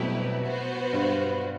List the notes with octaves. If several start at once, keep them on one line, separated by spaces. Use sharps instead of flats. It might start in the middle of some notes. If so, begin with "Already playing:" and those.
Already playing: B2 F#3 G3 A3 C4 E4 G4 B4
B3 F#4 C5
G2